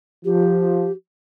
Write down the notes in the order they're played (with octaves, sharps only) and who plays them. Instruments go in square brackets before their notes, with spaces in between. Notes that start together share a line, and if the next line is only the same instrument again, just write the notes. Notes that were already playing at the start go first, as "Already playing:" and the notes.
[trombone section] F3 [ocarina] G4